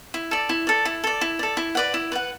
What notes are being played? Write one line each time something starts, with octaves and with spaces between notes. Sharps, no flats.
E4
A4 D5
E4
A4 D5
E4
A4 D5
E4
A4 D5
E4
B4 D5 F#5
E4
B4 D5 F#5